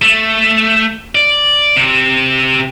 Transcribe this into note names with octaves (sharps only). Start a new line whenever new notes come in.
A3
D5
C3